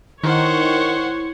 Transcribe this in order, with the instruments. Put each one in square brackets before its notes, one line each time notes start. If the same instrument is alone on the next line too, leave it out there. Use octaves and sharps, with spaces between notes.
[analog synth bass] D#3 [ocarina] E4 [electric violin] C5 F#5 [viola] C#5 C#6